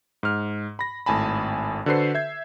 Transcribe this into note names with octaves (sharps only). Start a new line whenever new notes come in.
G#2 F6
B5 A#6
G#1 A2 G#5 A5 B5
D3 F#4 A4 B4 C5 C7
E5 G6 G#6